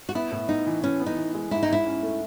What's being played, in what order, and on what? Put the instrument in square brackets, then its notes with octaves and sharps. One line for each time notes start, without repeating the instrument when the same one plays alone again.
[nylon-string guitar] F#4
[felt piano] B3 [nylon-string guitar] E4
[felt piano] A2
[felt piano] B3 [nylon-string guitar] D#4
[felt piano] E3
[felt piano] E3 [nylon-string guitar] C#4
[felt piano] B3
[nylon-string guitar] D#4
[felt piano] E3
G#3
[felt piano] G#2 [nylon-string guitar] E4
[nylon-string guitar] D#4
[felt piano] G#2 [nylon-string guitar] E4
[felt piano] C#4
A3